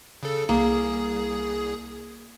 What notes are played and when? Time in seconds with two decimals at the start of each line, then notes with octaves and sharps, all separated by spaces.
0.23 C#3 A4
0.49 C2 A#3 G#4